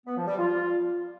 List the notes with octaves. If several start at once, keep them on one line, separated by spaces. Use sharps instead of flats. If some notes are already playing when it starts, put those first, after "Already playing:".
B3
F3
G3
F4